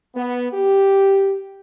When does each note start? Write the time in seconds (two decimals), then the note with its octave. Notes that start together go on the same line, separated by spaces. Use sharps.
0.15 B3
0.53 G4